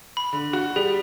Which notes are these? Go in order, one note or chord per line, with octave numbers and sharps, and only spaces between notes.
B5
D3
F#4
G3 G#4